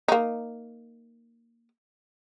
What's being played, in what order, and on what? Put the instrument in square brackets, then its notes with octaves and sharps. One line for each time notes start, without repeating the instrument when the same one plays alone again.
[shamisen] A#3 D#4